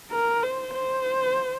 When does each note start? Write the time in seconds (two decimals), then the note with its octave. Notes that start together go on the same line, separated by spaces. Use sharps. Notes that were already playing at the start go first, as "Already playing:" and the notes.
0.11 A#4
0.43 C5
0.74 C5